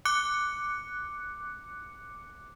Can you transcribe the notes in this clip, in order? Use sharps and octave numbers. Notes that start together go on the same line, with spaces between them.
D6 F#6 C#7